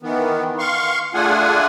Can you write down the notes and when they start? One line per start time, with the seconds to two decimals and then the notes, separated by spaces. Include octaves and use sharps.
0.03 D#3 E3 B3
0.59 F5 C6 C#6
1.14 A3 D4 F4 G#4 F#5 G#5